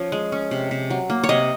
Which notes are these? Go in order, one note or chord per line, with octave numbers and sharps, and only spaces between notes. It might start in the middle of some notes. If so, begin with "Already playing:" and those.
Already playing: F3 C#4 C#5
G#3
C#4
C3
C3
F#3
A#3
C#5
C3 D#5